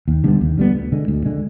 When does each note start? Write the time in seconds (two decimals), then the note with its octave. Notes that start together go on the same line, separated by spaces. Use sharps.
0.08 D#2
0.24 D3 G3 B3
0.41 D#2
0.57 D3 G3 B3
0.75 D2
0.92 D3 G#3
1.08 D2
1.25 D3 G#3